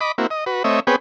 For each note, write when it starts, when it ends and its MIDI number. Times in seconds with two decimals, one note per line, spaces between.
0.01 0.12 75
0.01 0.12 83
0.01 0.12 86
0.18 0.27 58
0.18 0.27 60
0.18 0.27 64
0.18 0.27 66
0.31 0.44 75
0.46 0.63 66
0.46 0.63 71
0.64 0.80 57
0.64 0.80 60
0.64 0.80 73
0.64 0.80 75
0.64 0.80 76
0.87 0.96 59
0.87 0.96 60
0.87 0.96 68
0.87 0.96 71
0.87 0.96 73
0.87 0.96 79